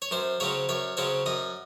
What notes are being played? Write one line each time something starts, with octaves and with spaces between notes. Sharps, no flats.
C#5
F#2 C5
C#3 F#3 C4 C#5
F#2 C#5
C#3 F#3 C4 C#5
F#2 D#5